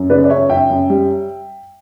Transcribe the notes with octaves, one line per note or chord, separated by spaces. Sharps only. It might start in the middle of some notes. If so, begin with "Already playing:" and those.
Already playing: F#2
C#3 B4 D5
D5
C#3 C#5 E5
F#2 E5 G5
F#2
G3